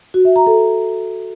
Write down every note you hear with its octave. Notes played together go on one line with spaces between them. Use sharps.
F#4
E5
A#5
A4